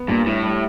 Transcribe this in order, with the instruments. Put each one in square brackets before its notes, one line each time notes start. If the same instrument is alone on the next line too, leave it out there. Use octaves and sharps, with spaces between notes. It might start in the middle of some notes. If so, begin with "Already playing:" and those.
Already playing: [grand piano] B3
[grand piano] G2 [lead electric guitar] A#2
[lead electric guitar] A2 [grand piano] G3
[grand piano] G3